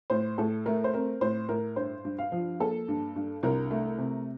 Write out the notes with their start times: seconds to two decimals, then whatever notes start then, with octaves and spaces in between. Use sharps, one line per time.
0.10 A2 C5
0.38 A2 A4
0.66 A3 A#4
0.84 C5
0.93 C4 A#4
1.21 A2 C5
1.49 A2 A#4
1.76 G2 C5
2.05 G2
2.18 F5
2.32 F3
2.60 A#3 A4
2.88 G2
3.16 G2
3.43 C2 A#4
3.71 A3
3.98 C3